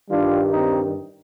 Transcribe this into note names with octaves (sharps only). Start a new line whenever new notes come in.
G2 D#3 G3 D4 F4
C4 D#4